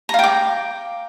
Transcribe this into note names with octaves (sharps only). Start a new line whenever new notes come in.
F5 G5 A#5 D6